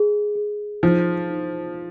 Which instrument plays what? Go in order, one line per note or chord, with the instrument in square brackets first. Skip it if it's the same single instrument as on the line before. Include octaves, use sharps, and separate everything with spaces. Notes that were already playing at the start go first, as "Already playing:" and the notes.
Already playing: [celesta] G#4
G#4
[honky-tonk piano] F3 [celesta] D#4
[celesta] D#4